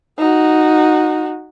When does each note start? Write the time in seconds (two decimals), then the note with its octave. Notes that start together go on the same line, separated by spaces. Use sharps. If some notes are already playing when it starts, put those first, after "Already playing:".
0.18 D#4 F#4